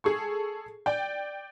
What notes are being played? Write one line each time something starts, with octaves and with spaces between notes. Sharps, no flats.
G#4 A4 C#6
D5 G5